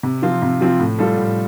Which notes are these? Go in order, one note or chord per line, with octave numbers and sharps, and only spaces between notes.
C3
F3 C4 F4
C3
F3 C4 F4
A2
G3 F4 A4
A2